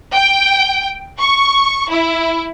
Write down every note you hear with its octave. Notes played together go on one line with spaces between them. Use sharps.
G5
C#6
E4